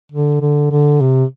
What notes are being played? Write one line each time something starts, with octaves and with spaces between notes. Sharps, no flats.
D3
D3
D3
C3